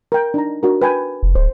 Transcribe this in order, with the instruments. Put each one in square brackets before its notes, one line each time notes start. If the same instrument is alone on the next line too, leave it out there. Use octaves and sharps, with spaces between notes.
[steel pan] A#4 G5
D4 D#4 A#5
D4 F#4 A#4
B4 G5 G#5
[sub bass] F1
[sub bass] D1 [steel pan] C5